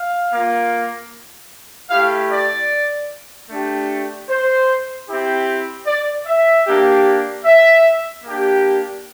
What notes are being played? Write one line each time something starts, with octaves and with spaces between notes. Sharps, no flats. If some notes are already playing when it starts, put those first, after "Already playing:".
Already playing: F5
A#3 F4
A3 E4 G4 F5
D5
A3 D4 G4
C5
C4 E4 G4
D5
E5
A#3 D4 G4
E5
A#3 D4 G4